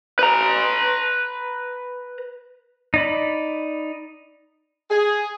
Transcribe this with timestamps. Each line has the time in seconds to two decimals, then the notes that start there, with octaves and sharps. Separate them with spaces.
0.19 B4 A#5
2.94 D#4 D5 B5
4.91 G#4